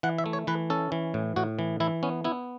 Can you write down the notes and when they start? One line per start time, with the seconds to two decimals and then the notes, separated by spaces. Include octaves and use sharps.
0.03 E3 F#5
0.18 E5
0.26 A3
0.33 C#5
0.47 E3 B4
0.70 C#4 A4
0.92 E3
1.14 A2
1.36 A2 F#4
1.59 E3
1.80 E3 E4
2.03 B3 C#4
2.24 B3 E4